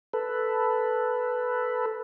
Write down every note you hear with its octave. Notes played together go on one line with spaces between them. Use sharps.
A4 B4